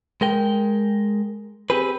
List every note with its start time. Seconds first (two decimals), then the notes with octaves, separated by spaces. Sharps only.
0.21 G#3 A#4 G5
1.70 C4 G4 G#4 B4